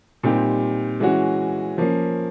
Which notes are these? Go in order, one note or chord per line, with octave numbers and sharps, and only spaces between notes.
A#2 G3 C4 D#4 G4
E3 G#3 C#4 F#4
F3 A#3 C#4